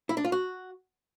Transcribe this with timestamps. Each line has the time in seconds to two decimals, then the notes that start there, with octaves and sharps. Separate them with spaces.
0.09 E4
0.17 D4
0.25 F4
0.32 F#4